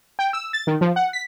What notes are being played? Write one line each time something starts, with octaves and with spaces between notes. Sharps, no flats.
G5
E6
A6
D#3
F3
F#5
B6